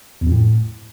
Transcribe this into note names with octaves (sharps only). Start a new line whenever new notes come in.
E2
F2
A2